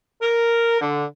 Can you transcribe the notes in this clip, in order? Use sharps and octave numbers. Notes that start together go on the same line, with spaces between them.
A#4
D3